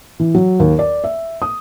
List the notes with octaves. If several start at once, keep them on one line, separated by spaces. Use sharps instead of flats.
E3
F#3
D#2
D5
E5
D#6